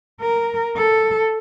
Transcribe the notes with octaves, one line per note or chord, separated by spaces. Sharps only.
A#4
A4